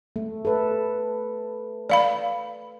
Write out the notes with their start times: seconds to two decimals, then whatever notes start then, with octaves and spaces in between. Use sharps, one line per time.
0.16 A3
0.45 A4 B4
1.90 D5 F5 B5